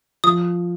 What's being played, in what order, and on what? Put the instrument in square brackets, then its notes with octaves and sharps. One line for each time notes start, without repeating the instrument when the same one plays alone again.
[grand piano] F3 [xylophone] D#6